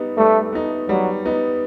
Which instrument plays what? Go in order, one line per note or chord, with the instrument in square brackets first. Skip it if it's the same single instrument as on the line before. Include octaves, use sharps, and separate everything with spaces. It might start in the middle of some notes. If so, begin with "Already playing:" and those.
Already playing: [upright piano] G3 B3 D#4
[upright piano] G3 [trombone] A3
[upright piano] B3 D#4
[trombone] F#3 [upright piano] G3
[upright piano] B3 D#4